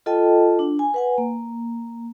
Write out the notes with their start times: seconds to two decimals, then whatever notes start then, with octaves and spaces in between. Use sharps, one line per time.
0.06 F4 A4 D#5 G5 A5
0.59 D4
0.79 G#5
0.94 B4 F#5 G#5
1.18 A#3